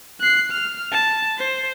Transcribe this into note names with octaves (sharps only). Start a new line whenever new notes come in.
F#6 C7
F6
A5
C5